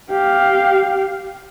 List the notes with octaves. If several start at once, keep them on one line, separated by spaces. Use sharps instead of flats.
G4 F5